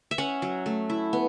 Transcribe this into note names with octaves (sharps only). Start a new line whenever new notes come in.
E5
C#4 F#5
F#3
A3
E4
B3